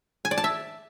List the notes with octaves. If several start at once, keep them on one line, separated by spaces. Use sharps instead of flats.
G#5
D5
A5
E5